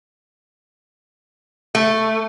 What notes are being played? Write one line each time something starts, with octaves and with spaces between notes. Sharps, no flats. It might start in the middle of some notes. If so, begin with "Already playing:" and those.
A3